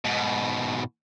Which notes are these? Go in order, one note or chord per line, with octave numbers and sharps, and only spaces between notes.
G#2 B2